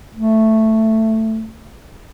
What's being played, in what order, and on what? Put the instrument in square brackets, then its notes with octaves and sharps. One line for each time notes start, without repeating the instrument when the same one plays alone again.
[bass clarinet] A3